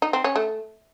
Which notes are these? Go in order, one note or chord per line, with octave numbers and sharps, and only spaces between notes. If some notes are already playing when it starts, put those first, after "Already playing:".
D#4
C4
C#4
A3